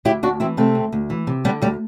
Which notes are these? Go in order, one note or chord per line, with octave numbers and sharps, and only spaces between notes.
D2 E4 G4
D2 D4 F#4
E3 C4 E4
C3 A3 C4
D2
D2
E3
C3
D3 G3 B3
D2 G3